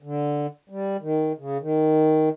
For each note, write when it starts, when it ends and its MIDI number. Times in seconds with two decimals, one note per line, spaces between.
0.03 0.47 50
0.69 0.97 55
1.01 1.32 51
1.38 1.58 49
1.61 2.29 51